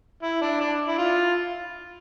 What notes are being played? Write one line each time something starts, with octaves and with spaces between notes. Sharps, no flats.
E4
D4
D4
E4
F4